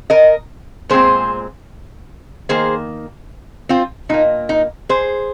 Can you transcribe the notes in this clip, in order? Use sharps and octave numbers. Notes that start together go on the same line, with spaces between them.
A#4 D#5
A#2 G#3 C4 G#4 C5
D#3 A#3 G#4 C5
C4 F4
A#2 A#3 D#4
D#4
G#4 C5